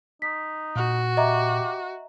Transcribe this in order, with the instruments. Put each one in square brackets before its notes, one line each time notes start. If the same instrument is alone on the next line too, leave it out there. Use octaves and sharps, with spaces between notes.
[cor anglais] D#4 [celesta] B6
[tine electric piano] A#2 [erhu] F#4
[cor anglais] G4 [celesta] D#5 E5 A#5